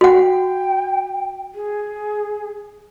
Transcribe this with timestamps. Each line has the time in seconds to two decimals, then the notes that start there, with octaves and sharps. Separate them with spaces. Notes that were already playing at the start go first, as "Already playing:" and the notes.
0.01 F#4 F#5 G5
1.55 G#4